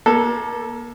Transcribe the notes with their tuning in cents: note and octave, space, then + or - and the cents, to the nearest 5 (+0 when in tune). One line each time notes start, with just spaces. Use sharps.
A#3 +30 A4 +0